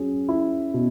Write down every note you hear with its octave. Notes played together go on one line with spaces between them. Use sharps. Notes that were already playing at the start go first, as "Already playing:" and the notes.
Already playing: F#3 C#4 G#4
E4
B2